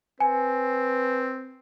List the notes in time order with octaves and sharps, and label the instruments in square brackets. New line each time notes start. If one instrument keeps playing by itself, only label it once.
[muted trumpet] C4 [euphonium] B4 [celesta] G#5